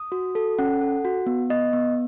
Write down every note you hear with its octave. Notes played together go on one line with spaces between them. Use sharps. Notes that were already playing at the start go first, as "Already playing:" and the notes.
Already playing: D#6
F#4
A4
C#4 F#5
A4
F#4
B3
B3 D#5
B3